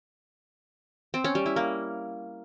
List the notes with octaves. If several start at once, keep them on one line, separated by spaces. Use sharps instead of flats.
C4
C#4
G3
E4
A#3